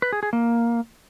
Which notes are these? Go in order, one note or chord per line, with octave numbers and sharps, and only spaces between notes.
B4
G#4
G#4
A#3